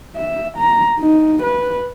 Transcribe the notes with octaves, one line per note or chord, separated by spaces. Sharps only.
E5
A#5
D#4
B4